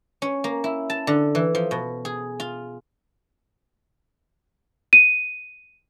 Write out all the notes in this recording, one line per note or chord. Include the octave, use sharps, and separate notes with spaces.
C#4
A#3
E4
A5
D3
E3
F3
B2
G#4
F4
D#7